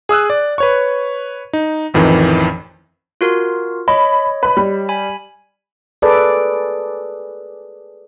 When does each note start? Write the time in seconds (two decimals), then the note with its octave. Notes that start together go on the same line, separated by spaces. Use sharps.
0.09 G#4 D#6 E6 F#6
0.30 D5
0.58 B4 C#5 C#6
1.53 D#4
1.94 A1 F2 D#3 E3
3.21 F4 F#4 A#4
3.88 C#5 D#5 B5
4.43 B4 B5
4.57 G3
4.89 G#5 B5
6.02 G#4 A4 B4 D5